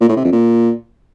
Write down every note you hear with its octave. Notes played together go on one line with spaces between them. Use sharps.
A#2
A2
C3
F2
A#2